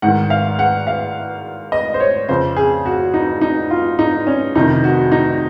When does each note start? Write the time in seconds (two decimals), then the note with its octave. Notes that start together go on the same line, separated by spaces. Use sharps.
0.02 G#2 D#3 F#5
0.30 F5
0.59 F#5
0.87 F5
1.72 D#5
1.94 C5
2.00 C#5
2.29 F2 C#3 C5
2.56 G#4
2.86 F#4
3.14 D#4
3.41 D#4
3.71 F4
3.99 D#4
4.27 C#4
4.55 F2 C3 D#3 D#4
4.84 F#4
5.12 D#4